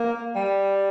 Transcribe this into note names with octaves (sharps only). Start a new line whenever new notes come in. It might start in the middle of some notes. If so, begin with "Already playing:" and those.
Already playing: A#3
G3